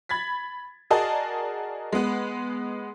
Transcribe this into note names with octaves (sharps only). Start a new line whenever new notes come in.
B5 G#6 A6 B6
F#4 G#4 A#4 D5 D#5 A5
G#3 B3